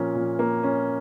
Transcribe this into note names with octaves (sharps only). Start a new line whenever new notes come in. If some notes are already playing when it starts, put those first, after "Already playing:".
Already playing: A#2 F3 A#3 C#4
A#2
A#3
C#4